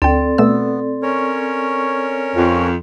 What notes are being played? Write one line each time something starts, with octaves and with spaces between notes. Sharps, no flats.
D2 C4 A4 D5 G5
B2 A3 B3 E6
C#4 A#4 C#5
F2